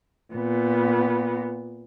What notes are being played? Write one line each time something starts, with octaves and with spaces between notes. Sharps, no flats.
A#2 B3